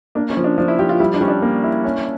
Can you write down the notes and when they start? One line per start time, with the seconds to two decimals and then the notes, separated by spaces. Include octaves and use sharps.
0.15 A#3 D4
0.30 C#4
0.37 F3
0.44 D4
0.58 F3 D4
0.68 E4
0.79 F3 G4
0.89 F4
1.00 G3 E4
1.14 D4
1.21 G3 C#4
1.28 D4
1.42 A#3
1.63 E4
1.84 C#4